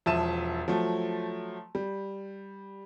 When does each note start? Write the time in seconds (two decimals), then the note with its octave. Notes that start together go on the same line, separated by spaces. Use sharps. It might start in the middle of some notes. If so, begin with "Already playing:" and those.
0.06 E1 F3 E5 A5 D#7 E7
0.68 F3 F#3 A3
1.75 G3